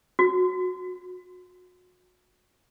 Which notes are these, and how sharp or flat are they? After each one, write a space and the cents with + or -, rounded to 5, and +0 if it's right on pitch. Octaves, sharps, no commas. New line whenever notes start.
F#4 -35